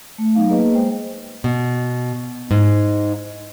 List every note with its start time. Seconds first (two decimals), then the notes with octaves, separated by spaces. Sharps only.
0.18 A3
0.35 F#3 B3 D#4 F5
0.49 A#3 G#4 B4 D#5
0.74 G#3 C5 G5
1.44 B2
2.51 G#2